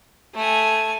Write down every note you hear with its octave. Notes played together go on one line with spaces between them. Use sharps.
A3 G#5